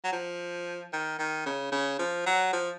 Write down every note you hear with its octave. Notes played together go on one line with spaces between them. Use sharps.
F#3
F3
D#3
D#3
C#3
C#3
F3
F#3
F3